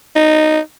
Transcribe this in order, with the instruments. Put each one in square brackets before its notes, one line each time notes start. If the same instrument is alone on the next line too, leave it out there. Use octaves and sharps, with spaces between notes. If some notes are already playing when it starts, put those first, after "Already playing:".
[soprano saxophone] D#4